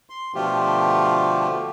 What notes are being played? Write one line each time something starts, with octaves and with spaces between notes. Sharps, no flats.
C6
B2 D3 F3 A3 F4 G4